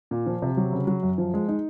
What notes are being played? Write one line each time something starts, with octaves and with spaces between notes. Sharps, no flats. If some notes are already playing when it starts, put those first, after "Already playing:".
A#2
F3
C3
F#3
C#3
F#3
F#2
F3
G#3
D#4